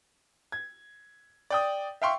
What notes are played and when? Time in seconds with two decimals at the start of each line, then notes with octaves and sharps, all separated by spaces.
0.52 G#6
1.50 D5 G5 D#6
2.02 E5 F5 G5 C6 C#6